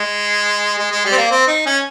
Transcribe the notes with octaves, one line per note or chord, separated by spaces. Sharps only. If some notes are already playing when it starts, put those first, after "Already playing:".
Already playing: G#3
G#3
G#3
G3
C4
A#3
C4
D#4
C#4